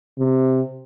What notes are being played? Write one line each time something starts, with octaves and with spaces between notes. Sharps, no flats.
C3